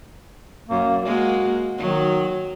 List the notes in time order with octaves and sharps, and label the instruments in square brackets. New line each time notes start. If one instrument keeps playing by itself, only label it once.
[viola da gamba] F#2 [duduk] A#3
[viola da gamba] G#3 A#3 [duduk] F#4
[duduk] D#3 [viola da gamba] F#3